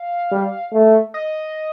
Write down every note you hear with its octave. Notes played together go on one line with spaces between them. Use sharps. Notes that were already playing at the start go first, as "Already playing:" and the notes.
Already playing: F5
G3
A3
D#5